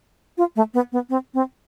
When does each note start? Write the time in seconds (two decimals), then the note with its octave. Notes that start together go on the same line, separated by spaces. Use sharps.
0.38 F4
0.56 A3
0.74 B3
0.92 B3
1.09 C4
1.34 C4